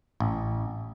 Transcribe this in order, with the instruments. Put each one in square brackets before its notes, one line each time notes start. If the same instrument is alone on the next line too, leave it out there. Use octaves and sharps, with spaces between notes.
[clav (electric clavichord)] A1